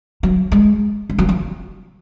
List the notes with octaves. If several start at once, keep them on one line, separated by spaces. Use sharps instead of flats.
F#3
G#3
G#3
F#3
F3